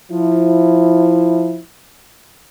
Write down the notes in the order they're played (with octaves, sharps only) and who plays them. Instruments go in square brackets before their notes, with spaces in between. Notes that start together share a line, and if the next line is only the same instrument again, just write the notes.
[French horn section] F3 E4